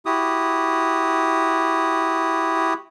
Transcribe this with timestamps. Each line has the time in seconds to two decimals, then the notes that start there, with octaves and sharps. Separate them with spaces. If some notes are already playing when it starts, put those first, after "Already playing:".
0.06 E4 F#4 G4 D#6